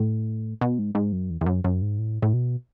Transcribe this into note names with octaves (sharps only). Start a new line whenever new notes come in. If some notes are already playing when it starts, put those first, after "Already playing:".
Already playing: A2
B2
G#2
G#2
F#2
E2
E2
F#2
F#2
G#2
A2
A2
B2